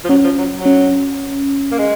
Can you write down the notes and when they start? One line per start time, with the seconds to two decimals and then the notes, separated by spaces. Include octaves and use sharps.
0.04 F3
0.09 F#3 C#4
0.24 F3
0.38 F#3
0.52 F#3
0.66 C#4
1.71 A#3
1.79 G#3